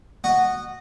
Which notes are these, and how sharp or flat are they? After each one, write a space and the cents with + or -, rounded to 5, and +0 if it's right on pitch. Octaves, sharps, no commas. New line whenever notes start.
F#4 +0 D#5 -15 F#5 +0